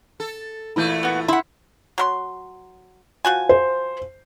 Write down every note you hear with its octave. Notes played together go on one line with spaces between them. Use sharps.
A4
A#2 E3 A3 E4 G6 D#7
B3 F#4
E4 F#5 B5 C6
F#3 A#4 C6
F3 F#4 G#5
C5